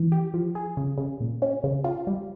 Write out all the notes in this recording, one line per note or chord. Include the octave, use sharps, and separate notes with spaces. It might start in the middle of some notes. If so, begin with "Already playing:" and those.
Already playing: E3
G4
F3
G#4
C#3
C#3
A#2
C#4
C#3
F4
G3